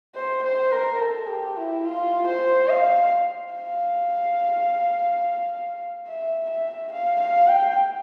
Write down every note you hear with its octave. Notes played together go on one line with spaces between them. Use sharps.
C5
C5
A#4
A4
G4
E4
F4
C5
F5
F5
E5
E5
F5
F5
G5